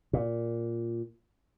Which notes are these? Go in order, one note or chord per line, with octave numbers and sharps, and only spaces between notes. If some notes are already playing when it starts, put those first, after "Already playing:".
A#2